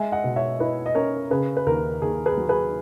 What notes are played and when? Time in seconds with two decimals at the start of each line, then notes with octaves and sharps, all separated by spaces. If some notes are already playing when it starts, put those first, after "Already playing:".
Already playing: G#3 E5 G#5
0.12 D#5 F#5
0.24 B2
0.36 C#5 E5
0.60 E4 B4 D#5
0.86 D#5
0.95 C#4 A#4 C#5
1.31 C#3 G#4 B4
1.57 B4
1.66 D#2 A#4
2.02 D#2 G#4
2.26 G#4 B4
2.37 F#3
2.49 G#4 B4